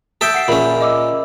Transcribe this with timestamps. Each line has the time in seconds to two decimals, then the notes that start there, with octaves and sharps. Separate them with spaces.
0.21 A4 E5 G5 D#6 E6 G6
0.34 F#5 C7 D7
0.48 A#2 C#4 G#4 E5 B5
0.81 D#5 D6 E6